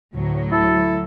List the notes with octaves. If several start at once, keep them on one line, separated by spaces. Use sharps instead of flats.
D2 A2 F#3
E4 A4